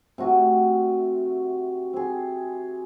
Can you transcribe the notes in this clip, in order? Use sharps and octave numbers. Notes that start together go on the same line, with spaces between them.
C3 A3 F#4
C4 G#4